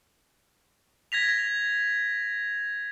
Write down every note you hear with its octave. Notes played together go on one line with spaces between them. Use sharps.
G#6 A#6 B6 F7